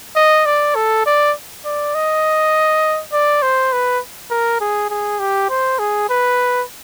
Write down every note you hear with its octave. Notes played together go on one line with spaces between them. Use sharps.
D#5
D5
A4
D5
D5
D#5
D5
C5
B4
A#4
G#4
G#4
G4
C5
G#4
B4